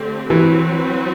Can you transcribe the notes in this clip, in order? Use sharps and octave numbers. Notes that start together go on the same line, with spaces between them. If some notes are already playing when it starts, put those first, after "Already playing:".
Already playing: D3 A3 C4 G4
E3 F#3 C4 F#4 B4